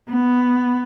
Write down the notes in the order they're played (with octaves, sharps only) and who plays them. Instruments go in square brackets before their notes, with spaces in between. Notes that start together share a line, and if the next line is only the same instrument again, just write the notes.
[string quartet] B3